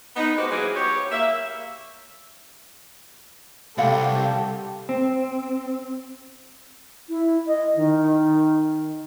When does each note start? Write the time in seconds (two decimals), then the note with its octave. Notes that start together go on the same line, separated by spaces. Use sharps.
0.16 B3 D#4
0.37 G#3 F#4 G4 B4 C5
0.50 E3 F#3 A#3 G#4
0.75 B3 G4 C#5
1.11 A#3 E5
3.78 C2 G4 A4 D5 F5 F#5
4.89 C4
7.08 E4
7.47 D#5
7.76 D#3